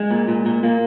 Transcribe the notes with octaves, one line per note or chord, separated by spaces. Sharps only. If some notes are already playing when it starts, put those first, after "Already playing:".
Already playing: G#3
A#2
A#2
A#2
A#2 A#3